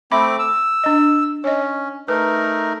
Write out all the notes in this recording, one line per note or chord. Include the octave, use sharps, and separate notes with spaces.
A3 C4 E5 B5 D6
E6
D4 D#5
C#4 C#5 D#5
A3 D#4 A#4 B4